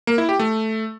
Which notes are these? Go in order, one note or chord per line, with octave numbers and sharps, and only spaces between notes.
A#3
E4
G4
A3